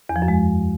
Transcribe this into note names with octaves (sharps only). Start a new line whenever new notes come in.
E2
F3
F#2
G#3